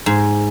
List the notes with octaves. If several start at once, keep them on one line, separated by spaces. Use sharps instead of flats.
G#2